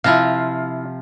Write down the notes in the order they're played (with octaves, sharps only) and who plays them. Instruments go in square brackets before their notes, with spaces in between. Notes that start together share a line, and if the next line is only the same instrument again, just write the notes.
[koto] C3 F3 F4 [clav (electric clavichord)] E4 F5